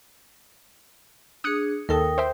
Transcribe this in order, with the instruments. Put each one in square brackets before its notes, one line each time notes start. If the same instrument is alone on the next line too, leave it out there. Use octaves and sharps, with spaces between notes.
[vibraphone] D4 G#4 [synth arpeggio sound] D#6 F#6 C#7
[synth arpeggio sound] D#2 A4 [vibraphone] A#4 G5 D#6
[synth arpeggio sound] C5 E5 G5